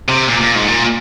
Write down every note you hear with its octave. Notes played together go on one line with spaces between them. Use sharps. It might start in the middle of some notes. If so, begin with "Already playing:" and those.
C3
A#2
A#2
G#2
A#2